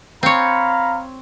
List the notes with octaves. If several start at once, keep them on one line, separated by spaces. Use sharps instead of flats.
C4 C#5 F5 A#5 B5